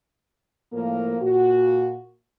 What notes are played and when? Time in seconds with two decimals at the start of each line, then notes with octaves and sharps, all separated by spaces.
0.72 A2 F3 A#3 A#4
1.22 A#2 F#4